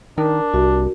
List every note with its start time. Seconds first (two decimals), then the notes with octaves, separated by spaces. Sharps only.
0.18 D#3 D4 A#4
0.54 C2 F#4